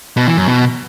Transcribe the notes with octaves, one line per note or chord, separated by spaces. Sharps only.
B2
E3
F#2
B2